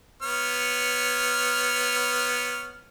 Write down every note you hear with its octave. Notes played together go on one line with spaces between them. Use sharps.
B3 C#5 F6